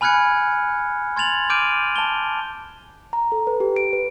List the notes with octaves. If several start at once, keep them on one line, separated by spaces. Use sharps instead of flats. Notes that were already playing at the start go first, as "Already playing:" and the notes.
G#5 B5 F6 F#6 G#6 C#7
C6 G#6 A6 F7 F#7
D6 F6 G6 D7 D#7
A5 F7 G7
A#5
A4
B4
G4
D7
B4